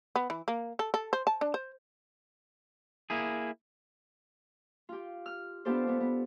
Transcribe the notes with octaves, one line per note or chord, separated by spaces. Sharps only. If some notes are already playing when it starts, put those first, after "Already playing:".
B3
E3
A#3
A4
A4
C5
A5
D4
C5
A#3 E4 G#4
F4 G4
F6
B3 D4 F4 G4 A4 C5
B3 D4
B3